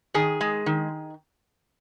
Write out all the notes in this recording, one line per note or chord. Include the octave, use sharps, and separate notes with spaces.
D#3 G#4
G#3
D#3